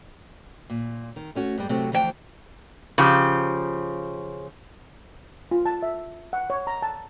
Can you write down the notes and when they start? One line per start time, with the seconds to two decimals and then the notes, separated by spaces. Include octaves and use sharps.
0.70 A#2
1.16 D#3
1.35 A3 C#4 F#4
1.58 G2 G3 G#3
1.69 C3 F#3 A3 C4
1.92 D2 E3 F3 A#4 G5 A5
2.98 C#3 F3 G4
5.51 F4
5.66 A5
5.83 E5
6.33 F#5
6.50 C#5
6.67 A#5
6.82 A5